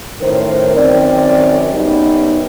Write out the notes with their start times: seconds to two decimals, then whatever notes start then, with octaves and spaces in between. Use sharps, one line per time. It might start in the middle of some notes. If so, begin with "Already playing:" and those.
0.21 F#2 A2 D#3 A#4 C5
0.75 F#2 D#3 C4 D5
1.74 F#2 B2 G3 D#4